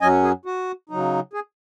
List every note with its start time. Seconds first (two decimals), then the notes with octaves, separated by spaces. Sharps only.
0.01 F#2 F#3 C#4 D#5 G#5
0.23 G#4
0.45 F#4
0.89 C#3 F#3 D#4
1.33 G#4